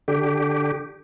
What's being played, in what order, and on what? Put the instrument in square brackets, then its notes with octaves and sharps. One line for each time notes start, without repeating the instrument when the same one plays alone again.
[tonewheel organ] D3 G4